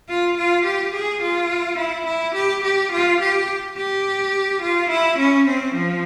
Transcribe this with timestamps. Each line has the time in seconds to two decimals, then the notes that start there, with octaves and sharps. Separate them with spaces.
0.09 F4
0.38 F4
0.65 G4
0.94 G#4
1.22 F4
1.78 E4
2.07 E4
2.35 G4
2.64 G4
2.92 F4
3.21 G4
3.77 G4
4.62 F4
4.90 E4
5.19 C#4
5.47 C4
5.75 F3